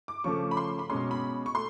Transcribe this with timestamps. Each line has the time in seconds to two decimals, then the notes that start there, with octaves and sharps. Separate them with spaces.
0.08 D6
0.24 C#3 F3 A3 C#6
0.51 B5
0.57 C6
0.79 B5
0.90 B2 G#3 C#4 C6
1.11 B5
1.46 C#6
1.55 A3 C6